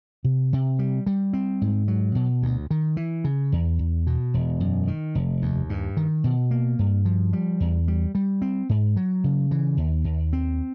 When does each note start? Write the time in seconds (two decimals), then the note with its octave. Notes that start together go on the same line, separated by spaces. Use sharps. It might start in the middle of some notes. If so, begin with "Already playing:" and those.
0.24 C3
0.53 C3
0.79 G3
1.06 G3
1.33 C4
1.61 G#2
1.88 F#3
2.15 B2
2.42 D2
2.71 D#3
2.97 E3
3.24 C#3
3.52 E2
3.79 E2
4.07 B2
4.34 E1
4.60 F#2
4.87 D#3
5.15 F1
5.42 D#2
5.70 G2
5.97 D#3
6.24 B2
6.51 A#3
6.79 G2
7.05 F3
7.33 G3
7.60 E2
7.88 G3
8.15 G3
8.42 C4
8.69 G#2
8.96 F#3
9.24 C#3
9.51 E3
9.77 D#2
10.04 D#2
10.33 C4